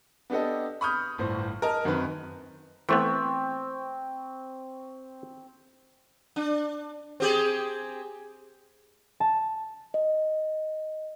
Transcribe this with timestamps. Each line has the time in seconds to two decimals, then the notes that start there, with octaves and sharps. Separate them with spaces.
0.30 B3 D4 G4 A4 D#5
0.81 B5 C#6 D#6 F6 G6
1.18 G1 A2 C5
1.62 A#4 D#5 A5 F6
1.85 F#2 D#3 C4 B4
2.89 E3 A3 B3 C4 C#6
6.36 D4
7.20 C4 G4 G#4
9.20 A5
9.94 D#5